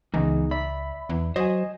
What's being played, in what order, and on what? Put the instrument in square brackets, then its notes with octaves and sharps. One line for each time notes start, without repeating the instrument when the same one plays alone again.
[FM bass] C#2 [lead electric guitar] E3 [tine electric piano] G#3 B3 D#4
[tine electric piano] D5 E5 [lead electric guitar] B5
[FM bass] E2
[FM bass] F#3 [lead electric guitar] C5 [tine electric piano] D#5 G#5